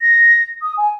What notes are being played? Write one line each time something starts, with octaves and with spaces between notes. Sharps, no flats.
A#6
D#6
G#5